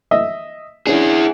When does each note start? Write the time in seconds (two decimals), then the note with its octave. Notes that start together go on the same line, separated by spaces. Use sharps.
0.11 D#5 E5
0.87 C#4 D4 E4 G#4